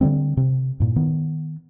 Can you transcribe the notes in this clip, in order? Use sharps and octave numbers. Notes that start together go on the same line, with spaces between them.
D3 E3 G3 C4
C3
G2 A#2
D#3 B3